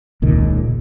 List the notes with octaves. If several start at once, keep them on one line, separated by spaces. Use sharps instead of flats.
E1 C#2 A#2 D#3